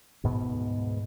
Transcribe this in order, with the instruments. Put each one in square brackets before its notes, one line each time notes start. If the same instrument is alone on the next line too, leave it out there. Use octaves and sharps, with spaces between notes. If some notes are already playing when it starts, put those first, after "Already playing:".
[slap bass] D2 G#2 B2 B3